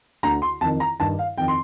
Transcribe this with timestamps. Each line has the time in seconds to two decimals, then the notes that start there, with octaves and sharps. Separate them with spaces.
0.23 D2 D3 A#5
0.42 C6
0.61 F2 A5
0.65 D#3
0.80 A#5
0.99 G2 D#3 A5
1.19 F5
1.38 F2 D#3 G5
1.48 C6